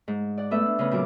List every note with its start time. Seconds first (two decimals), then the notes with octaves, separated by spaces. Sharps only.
0.08 G#2
0.38 D5 F#5
0.51 A3 B3 A4 E5
0.66 D4
0.79 C#3 B3
0.91 A#2 F#3 D6